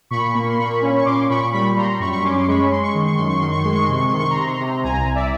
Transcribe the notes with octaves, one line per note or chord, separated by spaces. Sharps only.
A#2 B5 C#6
A#3
C6
A#2 B5 C#6
C#4
C#6
A#2 C6 D6
A#2 B5 C#6
G3 B5 C#6
G3 A#5 C6
F#2 B5 C#6
C#6
C#4 C6 D6
C6
G#3 B5 C#6
G#3 C6
C#6
D#3 C6
C#6
F#2 C6
C#6
D#3 C6
C#6
G#3 C6
C#6
C3 C6
C#6
C6
D#3
C#6
A#5 C6
C3
C3
C2 G#5 A#5
C2
D5 E5